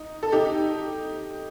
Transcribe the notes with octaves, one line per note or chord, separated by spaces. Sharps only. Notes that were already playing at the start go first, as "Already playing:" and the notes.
Already playing: D#4
A4
D#4 G4